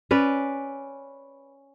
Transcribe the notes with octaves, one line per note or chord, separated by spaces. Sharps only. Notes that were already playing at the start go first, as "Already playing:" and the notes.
C#4 B4 D5